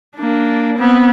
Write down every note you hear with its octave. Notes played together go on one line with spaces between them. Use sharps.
A#3 D4
B3 C4